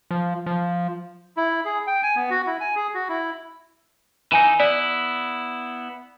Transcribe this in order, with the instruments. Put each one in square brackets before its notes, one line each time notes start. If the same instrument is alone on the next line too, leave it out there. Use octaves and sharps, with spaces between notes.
[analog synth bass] F3
F3
[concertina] E4
G#4
G5
G#5
B3
F#4
E4
G#5
G#4
F#4
E4
[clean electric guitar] E3 D#4 [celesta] G#5 D#7
[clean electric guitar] B3 E4 [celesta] D5